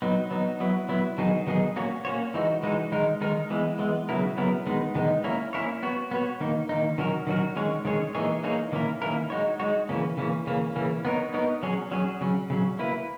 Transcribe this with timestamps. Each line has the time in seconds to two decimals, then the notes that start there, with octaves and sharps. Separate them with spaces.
0.02 F#3 B3 D#4
0.31 F#3 B3 D#4
0.60 F#3 B3 E4
0.89 F#3 B3 E4
1.18 D#3 F#3 B3 D#4 G#4
1.47 D#3 F#3 B3 D#4 G#4
1.76 A#3 C#4 F#4 C#5
2.05 A#3 C#4 F#4 C#5
2.34 E3 G#3 D#4 F#4
2.63 E3 G#3 D#4 F#4
2.92 D#3 G#3 D#4 A#4
3.21 D#3 G#3 D#4 A#4
3.50 E3 G#3 B3
3.79 E3 G#3 B3
4.09 C#3 F#3 B3 E4 A#4
4.37 C#3 F#3 B3 E4 A#4
4.66 D#3 G#3 B3 D#4
4.95 D#3 G#3 B3 D#4
5.24 A#3 C#4 E4 A#4 C#5
5.53 A#3 C#4 E4 A#4 C#5
5.83 B3 F#4 C#5
6.11 B3 F#4 C#5
6.41 D#3 A#3 D#4
6.69 D#3 A#3 D#4
6.98 D#3 F#3 C#4 F#4 A#4
7.27 D#3 F#3 C#4 F#4 A#4
7.56 D#3 G#3 C#4 G#4 C#5
7.85 D#3 G#3 C#4 G#4 C#5
8.15 E3 A#3 D#4 G#4 C#5
8.43 E3 A#3 D#4 G#4 C#5
8.72 D#3 A#3 C#4 E4 A#4
9.02 D#3 A#3 C#4 E4 A#4
9.30 G#3 D#4 F#4 C#5
9.60 G#3 D#4 F#4 C#5
9.89 C#3 E3 A#3 C#4
10.17 C#3 E3 A#3 C#4
10.47 C#3 E3 A#3 C#4
10.76 C#3 E3 A#3 C#4
11.05 B3 D#4 A#4 C#5
11.34 B3 D#4 A#4 C#5
11.63 F#3 C#4 G#4 C#5
11.92 F#3 C#4 G#4 C#5
12.21 C#3 F#3 C#4
12.50 C#3 F#3 C#4
12.79 A#3 E4 B4